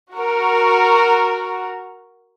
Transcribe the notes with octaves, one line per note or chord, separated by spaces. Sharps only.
F#4 A#4